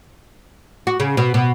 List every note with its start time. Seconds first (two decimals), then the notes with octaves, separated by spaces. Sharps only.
0.87 F#4
1.00 C#3
1.17 B2
1.34 B2